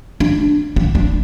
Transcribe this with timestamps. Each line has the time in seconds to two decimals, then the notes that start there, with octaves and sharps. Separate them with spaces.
0.20 D4
0.76 D4
0.95 D4